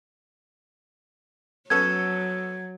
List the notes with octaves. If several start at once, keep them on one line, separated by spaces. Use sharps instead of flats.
F#3 B3 C#4 A4 G#6